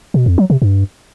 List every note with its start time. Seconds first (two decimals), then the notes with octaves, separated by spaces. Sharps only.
0.14 B2
0.26 F2
0.38 F#3
0.50 C3
0.62 G2